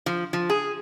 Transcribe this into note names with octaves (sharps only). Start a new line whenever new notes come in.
F3
F3
G#4